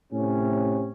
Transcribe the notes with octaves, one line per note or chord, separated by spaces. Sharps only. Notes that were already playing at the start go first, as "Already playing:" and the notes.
A2 C3 C#4